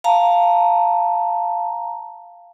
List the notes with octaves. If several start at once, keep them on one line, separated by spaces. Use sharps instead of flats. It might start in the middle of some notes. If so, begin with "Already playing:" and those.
F5 A5 A#5